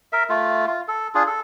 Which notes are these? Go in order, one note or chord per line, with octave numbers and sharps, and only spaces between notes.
A#4 E5
A3 F4
F4
A4
D4 F4 G#4
A4